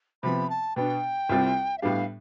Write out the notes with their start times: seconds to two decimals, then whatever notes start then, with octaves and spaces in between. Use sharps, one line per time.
0.23 C3 F3 B3 B5
0.50 A5
0.76 B2 B3 D4 G5
1.29 C2 C3 G3 C4 F4
1.78 E5
1.82 A2 G3 B3 D4 G4 F5